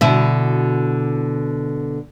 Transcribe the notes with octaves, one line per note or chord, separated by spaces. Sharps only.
B2 D3 E4